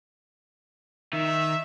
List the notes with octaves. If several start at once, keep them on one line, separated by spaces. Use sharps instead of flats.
D#3 E5